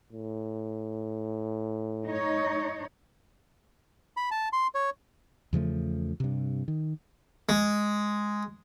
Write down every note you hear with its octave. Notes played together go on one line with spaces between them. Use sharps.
A2
D#4 C#5
B5
A5
C6
C#5
E2 C#3 F3 A3
G2 C3
D#3
G#3